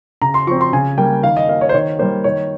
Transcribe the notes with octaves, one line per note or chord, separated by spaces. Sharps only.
C#3 A#5
C6
F3 C4 C#6
C6
C#3 G#5
G3 A#3 G5
D#3 F5
D#5
A#3 F5
C#5
C5
D#3 C#5
G3 A#3 C5
D#3 C#5